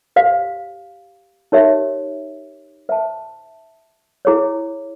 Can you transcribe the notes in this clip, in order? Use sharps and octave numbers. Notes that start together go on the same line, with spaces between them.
G4 C5 F5
D#4 G4 A#4 C#5 E5
C5 E5 A5
E4 G#4 C#5